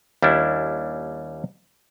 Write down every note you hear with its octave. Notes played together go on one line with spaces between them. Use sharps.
D#2 G3 C#4 D4 E4